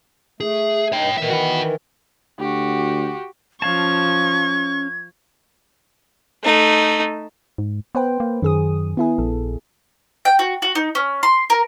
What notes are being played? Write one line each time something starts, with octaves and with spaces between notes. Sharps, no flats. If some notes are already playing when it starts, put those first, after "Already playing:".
A3 G#4
G2 D#4 C#5 G5
A#2 D#3 E3 E5
F#4 B4
D2 F#4 G4
F3 C#4 F5 A5 C#6 G#6
A3 D#4
G#2
B3 B4 C5 G5
A#3
F#2 D#3 G#4 D#6
B3 E4 G#4
A#1 A4
G5
F#4
F#4
D#4
C#4
C6
A#4